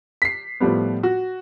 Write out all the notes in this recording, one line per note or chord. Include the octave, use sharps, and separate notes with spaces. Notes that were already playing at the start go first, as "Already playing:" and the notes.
B6 C7
A2 F3 G3 B3
F#4